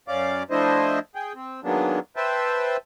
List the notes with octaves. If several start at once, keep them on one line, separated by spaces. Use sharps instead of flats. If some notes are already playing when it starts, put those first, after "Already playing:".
F#2 C#4 D5 F5 D6
F3 A3 D4 E4 C5 D#5
G#4 G5
C4
D#3 F#3 G#3 A#3 B3 D4
B4 C5 E5 G5 A5